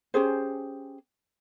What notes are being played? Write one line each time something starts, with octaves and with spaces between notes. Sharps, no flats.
C#4 G4 G#4 C5